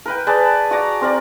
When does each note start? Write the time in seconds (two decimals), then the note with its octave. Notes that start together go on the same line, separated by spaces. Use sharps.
0.05 A#4 B4 G5
0.27 G#4 B4 D5 A5
0.71 F#4 D5 A#5
1.01 C4 A#4 D5